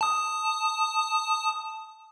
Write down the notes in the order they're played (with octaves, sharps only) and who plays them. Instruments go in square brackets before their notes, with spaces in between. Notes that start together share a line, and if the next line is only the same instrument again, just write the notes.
[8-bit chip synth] A5 D#6